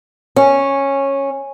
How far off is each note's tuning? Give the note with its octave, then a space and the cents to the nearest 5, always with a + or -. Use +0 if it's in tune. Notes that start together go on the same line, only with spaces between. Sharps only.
C#4 -10